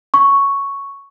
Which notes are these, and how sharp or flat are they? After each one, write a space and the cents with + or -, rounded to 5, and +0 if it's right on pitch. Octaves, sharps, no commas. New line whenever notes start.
C#6 +0